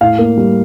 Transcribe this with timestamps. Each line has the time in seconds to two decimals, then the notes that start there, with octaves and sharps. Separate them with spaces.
0.01 A2 F5
0.19 A#3
0.38 G3